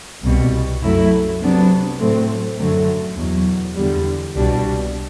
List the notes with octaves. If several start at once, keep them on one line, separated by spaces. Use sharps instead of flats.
C2 B2 G3
F#2 F#3 A3 E4
C3 F#3 B3 D4
A2 F#3 A3 C4
F#2 D3 F#3 A3
E2 B2 F#3
E2 D3 G3
C2 B2 G3 D4